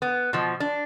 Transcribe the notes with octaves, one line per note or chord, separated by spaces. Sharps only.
B3
B2 F3
D4